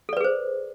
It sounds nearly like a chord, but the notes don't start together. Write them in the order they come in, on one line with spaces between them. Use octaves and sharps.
A4 D5 B4 G#4 C5